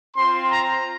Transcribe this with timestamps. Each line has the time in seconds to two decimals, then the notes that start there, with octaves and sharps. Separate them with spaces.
0.16 C4 F4 C6
0.51 A#5